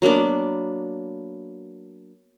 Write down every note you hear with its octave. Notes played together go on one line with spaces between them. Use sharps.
F#3 A#3 B3 D4